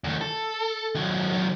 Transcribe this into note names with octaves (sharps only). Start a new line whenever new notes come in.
D2 D#3
A4
D#3 F#3
D#3 F#3